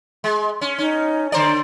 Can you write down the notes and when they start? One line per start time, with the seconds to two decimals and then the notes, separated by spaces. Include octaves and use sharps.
0.24 G#3
0.61 C#4
0.79 C#4 D#4
1.32 D3 C5 D5 A#5